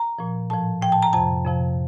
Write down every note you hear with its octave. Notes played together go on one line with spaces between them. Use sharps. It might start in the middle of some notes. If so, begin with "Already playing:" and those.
Already playing: A#5
A#2 F3
A2 F3 A5
A2 F3 G5
A5
A#5
F2 C3 F3 A5
F2 C3 F3